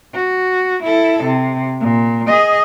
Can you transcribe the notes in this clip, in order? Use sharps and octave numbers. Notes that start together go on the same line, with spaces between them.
F#4
E4 A4
C3
A#2
G#4 D#5